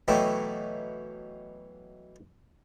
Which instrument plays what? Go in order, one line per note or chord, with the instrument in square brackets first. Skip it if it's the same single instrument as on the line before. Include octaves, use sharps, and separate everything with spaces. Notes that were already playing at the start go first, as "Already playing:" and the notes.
[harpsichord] B2 E3 F#3 A3 E4 G4